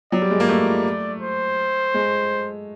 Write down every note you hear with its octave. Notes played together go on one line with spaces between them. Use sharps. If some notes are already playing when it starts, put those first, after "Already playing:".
F#3 D5
G3
G#3
A#3
A3 D5
C5
G#3